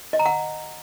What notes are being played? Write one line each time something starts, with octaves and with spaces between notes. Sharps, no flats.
D#5
A#5
F#5